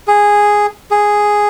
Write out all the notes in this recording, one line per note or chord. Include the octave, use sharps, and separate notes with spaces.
G#4
G#4